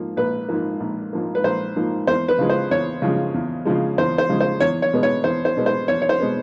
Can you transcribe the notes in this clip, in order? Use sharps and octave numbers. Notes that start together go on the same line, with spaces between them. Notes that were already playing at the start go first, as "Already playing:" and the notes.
Already playing: G#2 F3 A#3
A#1 B4
G#2 F3 A#3
A#1
G#2 F3 A#3
B4
A#1 C5
G#2 F3 A#3
E2 C5
B4
C#3 F3 G#3
C5
E2 C#5
C#3 F3 G#3
E2
C#3 F3 G#3
E2 C5
C5
C#3 F3 G#3
C5
E2 C#5
C#5
B2 G#3 B3
C#5
E2 C5
C5
B2 G#3 B3
C5
E2 C#5
C#5
C5
B2 G#3 B3